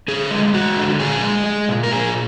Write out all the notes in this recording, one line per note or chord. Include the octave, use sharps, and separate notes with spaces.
D3 G#4
G#3
G#3 F#4
D3
A#2 G#4
G#3
G#3
A#2
A#4
A#2 G#4